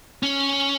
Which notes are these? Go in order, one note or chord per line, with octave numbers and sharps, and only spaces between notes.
C#4